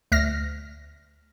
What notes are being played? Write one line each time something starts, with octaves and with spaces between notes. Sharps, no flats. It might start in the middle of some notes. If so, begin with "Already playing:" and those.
D2 F6 A#6